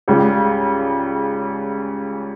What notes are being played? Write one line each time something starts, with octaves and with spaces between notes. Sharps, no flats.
C#2 C#3 G3